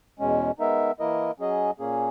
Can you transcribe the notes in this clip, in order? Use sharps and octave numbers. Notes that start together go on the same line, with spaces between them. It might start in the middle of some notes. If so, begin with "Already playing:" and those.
E2 B2 G#3 C#4
G#3 B3 D#4 A#4 E5
E3 A#3 E4 A#4 D#5
F#3 C#4 G#4 D#5
A#2 A#3 C#4 G#4